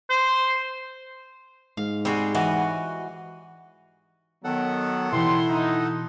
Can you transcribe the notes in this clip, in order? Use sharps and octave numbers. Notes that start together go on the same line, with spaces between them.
C5
G#2 F5
G3 C4 F#4 G#4
E3 F#4 D#5
D#3 F#3 B3 A4 F#5
B2 E3 E4 G4 C6
D#4